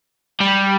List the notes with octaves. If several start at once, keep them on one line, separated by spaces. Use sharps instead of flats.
G3